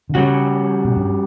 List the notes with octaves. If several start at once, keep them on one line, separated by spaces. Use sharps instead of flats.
D3
C#3 G3 C#4 F#4
B2
G2